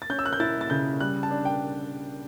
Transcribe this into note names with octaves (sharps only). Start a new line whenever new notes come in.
A6
C#4 G6
E6
F#6
G6
E4 A6
A6
C#3 G6
G3 F#6
A5
D4
G5